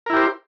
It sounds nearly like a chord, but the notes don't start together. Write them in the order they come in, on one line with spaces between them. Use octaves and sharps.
A#4 E4 G4 C5